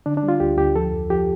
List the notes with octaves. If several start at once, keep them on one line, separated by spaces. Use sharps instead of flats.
D3 D4
D4
G3
F4
D2 G4
D2 G4
F3 A4
F2
F3 G4